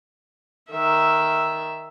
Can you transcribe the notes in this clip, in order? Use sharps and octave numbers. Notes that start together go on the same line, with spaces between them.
D#3 E5